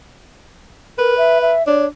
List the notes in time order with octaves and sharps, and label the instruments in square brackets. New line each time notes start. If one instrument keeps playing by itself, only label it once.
[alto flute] A#4 [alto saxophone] B4
[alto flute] E5
E5
[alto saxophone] D4 [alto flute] C#5